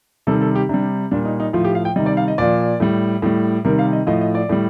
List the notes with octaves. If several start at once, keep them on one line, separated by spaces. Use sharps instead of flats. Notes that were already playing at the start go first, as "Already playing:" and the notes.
C3 D#3 G3 A4
A4
G4
C3 G3 D4
A#2 G3 D4
D#4
D#4
A2 F3 F4
G4
F5
G5
C3 D#3 G3 D#5
D5
F5
D#5
A#2 F3 D5
A2 G3
A2 G3
C3 D#3 G3 A#4
F5
D#5
A2 F3 D#5
D#5
D5
A2 G3